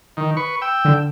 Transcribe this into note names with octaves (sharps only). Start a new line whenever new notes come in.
D#3
B4 C#6
G5 E6
D3